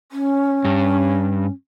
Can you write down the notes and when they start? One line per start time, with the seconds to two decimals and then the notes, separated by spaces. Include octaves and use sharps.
0.12 C#4
0.65 G2